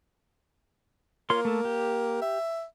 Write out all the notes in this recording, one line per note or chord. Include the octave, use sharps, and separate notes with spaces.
A#3 F4 C#5 C6
A3 A4
G4
E5